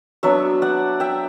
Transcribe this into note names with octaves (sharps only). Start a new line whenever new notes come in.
F#3 B3 D4 C#5 E5
D5 F#5
E5 G5